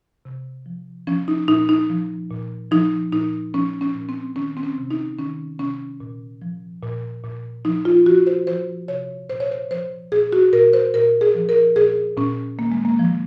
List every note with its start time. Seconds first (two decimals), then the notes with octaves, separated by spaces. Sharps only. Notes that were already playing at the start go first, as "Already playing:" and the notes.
0.25 C3
0.66 F3
1.07 F3 C#4
1.28 D#4
1.48 A#2 D#4
1.69 D#4
1.90 F3
2.31 A#2
2.71 F3 D#4
3.13 A#2 D#4
3.54 F3 C#4
3.81 C#4
3.95 A#2
4.09 C4
4.36 D#3 C#4
4.57 C4
4.63 C#4
4.78 C3
4.91 D#4
5.18 D#3 C#4
5.59 C3 C#4
6.00 A#2
6.42 F3
6.83 A#2
7.24 A#2
7.65 F3 D#4
7.85 F4
8.06 F3 F#4
8.27 C5
8.47 F3 C5
8.88 C3 C#5
9.30 A#2 C5
9.40 C#5
9.51 C5
9.71 F3 C5
10.11 A#2 G#4
10.33 F#4
10.53 A#2 A#4
10.73 C5
10.94 A#2 A#4
11.21 G#4
11.35 F3
11.49 A#4
11.76 A#2 G#4
12.17 A#2 C#4
12.58 D#3 A#3
12.72 G#3
12.85 A#3
12.99 D#3 F3